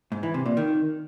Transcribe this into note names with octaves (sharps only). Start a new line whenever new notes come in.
G#2
E3
C3
A#2
D#3